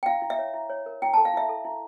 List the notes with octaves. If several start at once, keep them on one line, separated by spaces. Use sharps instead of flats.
G5
E4 F5
E4
E5
C#5
E4
C#5
A#4
E4 G5
A5
A4
F5
E4 E5
A4
E4